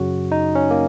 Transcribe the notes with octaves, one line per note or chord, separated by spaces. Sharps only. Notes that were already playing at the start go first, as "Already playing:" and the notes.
Already playing: F#2 C#3 F#3 F#4
D#4
C#4
A#3